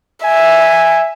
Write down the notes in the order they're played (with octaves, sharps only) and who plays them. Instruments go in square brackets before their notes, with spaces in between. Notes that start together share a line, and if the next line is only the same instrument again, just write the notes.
[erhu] E5 [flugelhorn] G#5